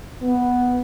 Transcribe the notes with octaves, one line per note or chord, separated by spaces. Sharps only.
B3